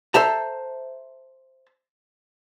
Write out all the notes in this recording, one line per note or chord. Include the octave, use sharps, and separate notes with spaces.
A4 C5 E5 A5 A#5